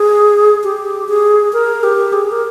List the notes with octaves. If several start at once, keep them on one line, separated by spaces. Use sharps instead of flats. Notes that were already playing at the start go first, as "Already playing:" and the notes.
Already playing: G#4
G4
G#4
A#4
G4
G#4
A#4